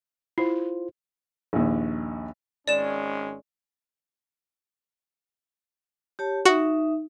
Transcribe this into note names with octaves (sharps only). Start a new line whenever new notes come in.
E4 F4 C5
A#1 D#2
G#1 G#3 C#4 D5 E7
G4 C#5 A5
D#4 F#4 E5